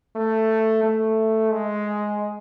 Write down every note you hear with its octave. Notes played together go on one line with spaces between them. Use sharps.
A3
A3
G#3